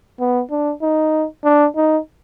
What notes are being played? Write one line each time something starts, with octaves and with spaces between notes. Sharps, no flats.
B3
D4
D#4
D4
D#4